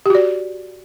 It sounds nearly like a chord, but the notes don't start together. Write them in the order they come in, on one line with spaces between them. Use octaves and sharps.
G4 F#4 D5